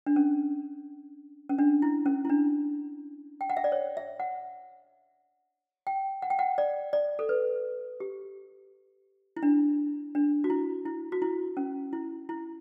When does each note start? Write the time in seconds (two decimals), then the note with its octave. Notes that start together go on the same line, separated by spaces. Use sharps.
0.06 D4
0.16 C#4
1.49 C#4
1.59 D4
1.82 E4
2.06 C#4
2.25 E4
2.29 D4
3.41 G5
3.50 F#5
3.57 E5
3.64 D5
3.72 C#5
3.97 E5
4.20 F#5
5.87 G5
6.22 F#5
6.30 G5
6.39 F#5
6.58 D5
6.93 D5
7.19 A4
7.29 B4
8.00 G4
9.37 E4
9.43 D4
10.15 D4
10.44 F#4
10.50 E4
10.86 E4
11.12 F#4
11.22 E4
11.57 C#4
11.93 E4
12.29 E4